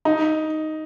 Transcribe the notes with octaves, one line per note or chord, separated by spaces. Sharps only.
D#4